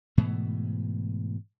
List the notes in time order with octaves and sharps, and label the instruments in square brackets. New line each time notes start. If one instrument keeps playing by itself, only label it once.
[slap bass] G#2 B2 E3 A3